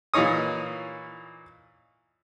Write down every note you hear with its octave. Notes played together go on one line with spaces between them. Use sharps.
A#2 E3 A#3 D#4 C#5 D#6